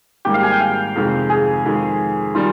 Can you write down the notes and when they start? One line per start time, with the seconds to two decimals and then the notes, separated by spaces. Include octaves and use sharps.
0.25 G#1 G#2 G3 A#3 G4
0.34 F5
0.43 G#5
0.52 G5
0.61 F5
0.96 F2 C3 D#3 G#3
1.30 G#4
1.65 F2 D#3 G#3
2.35 D#3 G3 F4